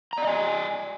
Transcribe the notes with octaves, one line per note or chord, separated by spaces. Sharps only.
D5 D#5 G#5 A#5